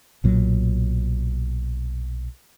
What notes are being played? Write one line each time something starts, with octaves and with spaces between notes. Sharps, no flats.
B1 A#2 F#3